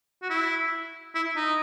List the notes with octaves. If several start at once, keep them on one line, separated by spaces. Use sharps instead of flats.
F#4
E4
E4
D#4